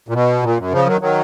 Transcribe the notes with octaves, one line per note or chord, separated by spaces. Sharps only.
A#2
B2
A#2
F#2
C#3 F3
D#3 F#3
D#3 F#3